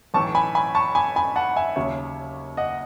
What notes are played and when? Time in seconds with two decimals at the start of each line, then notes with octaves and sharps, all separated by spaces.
0.14 B1 A2 E3 A5 C#6
0.35 G#5 B5
0.55 G#5 B5
0.75 A5 C#6
0.95 G#5 B5
1.16 G#5 B5
1.36 F#5 A5
1.56 E5 G#5
1.76 D#2 C#3 F#3 C#5 E5
2.57 D#5 F#5